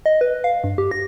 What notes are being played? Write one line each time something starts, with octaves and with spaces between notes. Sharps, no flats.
D#5
B4
F5
G2
G4
A#6